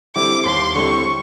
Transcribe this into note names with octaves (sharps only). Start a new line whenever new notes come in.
D3 G3 C4 E4 D6
D#2 C6
D3 G3 C4 E4 C#6